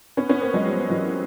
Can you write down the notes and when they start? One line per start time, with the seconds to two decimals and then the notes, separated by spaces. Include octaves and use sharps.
0.17 B3 C#4
0.29 B3 C#4
0.41 A#3 C4
0.54 F#3 G#3
0.66 F3 G3
0.90 E3 F#3